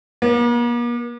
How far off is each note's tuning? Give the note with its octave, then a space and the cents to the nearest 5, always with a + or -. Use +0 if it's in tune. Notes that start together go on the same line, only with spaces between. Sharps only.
A#3 +45